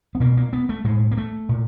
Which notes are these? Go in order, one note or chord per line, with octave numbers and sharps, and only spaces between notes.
B3
B2 A#3
A#3
B3
A3
A2 G#3
A#3
A3
A#2